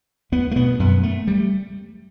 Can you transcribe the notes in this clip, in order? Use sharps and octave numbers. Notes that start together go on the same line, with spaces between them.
E2 B3
A3
B2 B3
F#2 B3
A3
G3